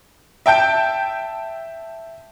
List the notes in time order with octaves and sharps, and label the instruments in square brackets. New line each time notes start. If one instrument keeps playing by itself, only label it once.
[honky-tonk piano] E5 G5 A5 G6 D7